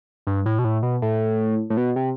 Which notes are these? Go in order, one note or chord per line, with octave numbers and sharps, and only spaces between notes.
G2
A2
B2
A2
B2
A2
A2
B2
C3